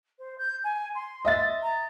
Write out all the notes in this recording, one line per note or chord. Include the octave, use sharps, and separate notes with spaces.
C5
G6
G#5
C6
D#5 E5 A6
A#5